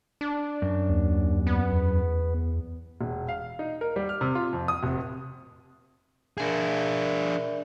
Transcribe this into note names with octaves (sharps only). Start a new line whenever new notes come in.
D4
F#2
D#2
B3
E2
E1
F5
D#4
A#4
G3
F6
C3
F4
F2
D#6
F1
D4 G#4 A#4 D5 E5